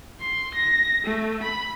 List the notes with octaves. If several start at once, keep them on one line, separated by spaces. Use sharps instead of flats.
C6
A#6
A3
B5